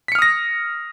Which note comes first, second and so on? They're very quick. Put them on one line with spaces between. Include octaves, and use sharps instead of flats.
B6 C#7 F6 D#6 A#6